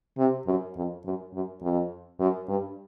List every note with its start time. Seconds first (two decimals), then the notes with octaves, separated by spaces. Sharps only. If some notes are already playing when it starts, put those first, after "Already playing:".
0.18 C3
0.47 F#2
0.76 F2
1.05 F#2
1.34 F#2
1.62 F2
2.20 F#2
2.48 G2